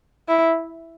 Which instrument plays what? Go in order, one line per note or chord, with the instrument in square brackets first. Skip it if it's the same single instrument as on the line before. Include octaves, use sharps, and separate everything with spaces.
[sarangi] E4